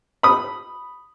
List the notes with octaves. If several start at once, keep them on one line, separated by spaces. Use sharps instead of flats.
B5 D#6